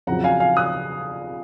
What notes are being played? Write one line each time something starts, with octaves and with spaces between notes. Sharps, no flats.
F2 C#3 F#3 F#5 A#5
F5 G#5
F5 G#5
D#6 F#6